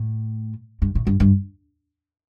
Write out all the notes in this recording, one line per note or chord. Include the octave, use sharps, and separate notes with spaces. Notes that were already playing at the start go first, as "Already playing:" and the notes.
Already playing: A2
G2
A2
G2
G2